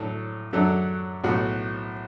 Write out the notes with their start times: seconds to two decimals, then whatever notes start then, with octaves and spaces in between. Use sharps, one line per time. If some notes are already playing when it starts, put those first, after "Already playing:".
Already playing: A2 F#3 D4 A4
0.53 F#2 F#3 D4 A4
1.24 B1 A2 A3 F#4